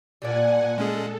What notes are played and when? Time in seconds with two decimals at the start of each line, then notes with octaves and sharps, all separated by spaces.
0.22 A#2 G3 D4 D5 F#5 G#5
0.78 G#3 C#4 G#4 A4